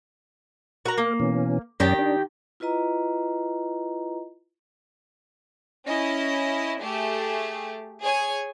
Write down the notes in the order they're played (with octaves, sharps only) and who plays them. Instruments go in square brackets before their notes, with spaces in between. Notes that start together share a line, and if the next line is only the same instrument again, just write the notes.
[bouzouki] F#4 A#5 [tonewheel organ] A#4
[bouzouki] A#3
[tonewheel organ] B2 E3 C#4
[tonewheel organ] F#2 C#4 D5 [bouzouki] D#3 G4 G5
[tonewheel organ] D4
[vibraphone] E4 F4 B4 D#5 A#5
[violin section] C#4 E4 D#5
A3 G4 G#4
G#4 C#5 G#5